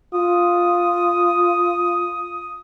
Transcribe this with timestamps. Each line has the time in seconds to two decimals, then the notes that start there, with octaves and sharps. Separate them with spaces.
0.14 F4 D#6